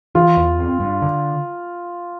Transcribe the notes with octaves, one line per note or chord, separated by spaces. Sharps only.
E3 F4
E2
C4
G2
D3